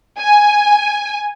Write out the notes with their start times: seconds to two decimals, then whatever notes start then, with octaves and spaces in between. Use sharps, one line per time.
0.18 G#5